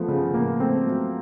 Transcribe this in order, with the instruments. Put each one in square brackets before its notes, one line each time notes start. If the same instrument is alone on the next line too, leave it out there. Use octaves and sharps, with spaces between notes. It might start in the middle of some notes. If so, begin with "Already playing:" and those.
Already playing: [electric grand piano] F3 B3 [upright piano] A3
[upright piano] C#3
[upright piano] A2 [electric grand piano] A#3
[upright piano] A3 [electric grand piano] C4
[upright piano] F#3